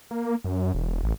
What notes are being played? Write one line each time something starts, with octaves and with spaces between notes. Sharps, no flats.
A#3
F#2
E1
A1